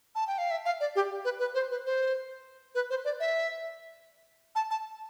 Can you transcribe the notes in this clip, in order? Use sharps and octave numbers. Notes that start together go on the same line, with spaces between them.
A5
G5
F5
E5
F5
D5
G4
B4
B4
C5
B4
C5
B4
C5
D5
E5
A5
A5